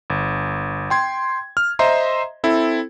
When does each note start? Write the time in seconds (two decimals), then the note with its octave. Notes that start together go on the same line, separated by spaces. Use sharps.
0.10 G1
0.90 G5 C6 G#6
1.57 F6
1.79 C5 D#5 E5 A#5 C6
2.44 C4 E4 A4